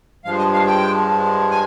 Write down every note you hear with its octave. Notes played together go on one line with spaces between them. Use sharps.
G2 F3 G#3 F5
D#5
F5
G5
G#5